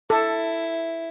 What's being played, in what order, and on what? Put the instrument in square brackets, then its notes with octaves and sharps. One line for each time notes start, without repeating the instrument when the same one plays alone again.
[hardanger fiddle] E4 [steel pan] A4